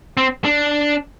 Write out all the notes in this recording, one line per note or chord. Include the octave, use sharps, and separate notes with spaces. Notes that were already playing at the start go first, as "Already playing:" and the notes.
C4
D4